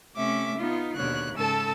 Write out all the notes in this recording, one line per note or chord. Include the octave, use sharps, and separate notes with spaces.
C3 A3 C#4 E5 D6
B3 D#4 F4
D#2 B2 D3 C#5 F#6
G#2 C#3 A4 A5 E6